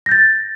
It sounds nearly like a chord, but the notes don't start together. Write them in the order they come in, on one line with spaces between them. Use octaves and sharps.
A#6 G6 A6